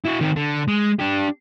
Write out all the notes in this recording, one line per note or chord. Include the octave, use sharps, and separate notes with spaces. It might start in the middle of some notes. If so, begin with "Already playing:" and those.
E4 F#4
D#3 C4
D3
G#3
D4 G4